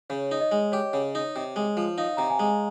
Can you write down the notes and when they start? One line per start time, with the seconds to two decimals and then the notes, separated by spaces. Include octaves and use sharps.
0.10 C#3 C#5
0.31 D#4
0.41 D#5
0.52 G#3
0.72 G4 C#5
0.93 C#3
1.15 D#4
1.36 C3
1.56 G#3
1.77 F3
1.98 D#4 F5
2.17 C3 A#5
2.30 G#5
2.39 G#3